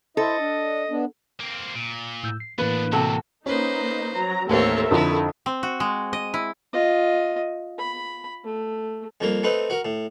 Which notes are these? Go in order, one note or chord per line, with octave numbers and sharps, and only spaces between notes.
E4 A4 C5 D#5 E5
D4
B3 D4
A#3 C4
A#2
A2 E6 G6
C7
A2 E3 A#3 B3 D4 B4
C#2 C3 F#3 F#4 A4
A#3 C#4 D#4 B4 C5
F#3 A#5
A1 D#2 C4 A4 A#4 C#5 E5
F2 D3 D#4 E4
C4
F#4
G#3
D#5
E4
F4 D#5
B5
A3
F2 G3 A#3
A3 C4 D#4 B4
F#4 A#4
A2